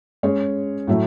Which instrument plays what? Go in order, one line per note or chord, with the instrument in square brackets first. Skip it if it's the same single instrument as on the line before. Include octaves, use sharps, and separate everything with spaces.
[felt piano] G#3 C#4 G#4 C#5
A2 F#3 A3 E4